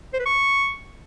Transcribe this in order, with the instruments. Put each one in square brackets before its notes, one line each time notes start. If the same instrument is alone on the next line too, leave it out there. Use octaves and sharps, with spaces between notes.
[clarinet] C5
B4
C#6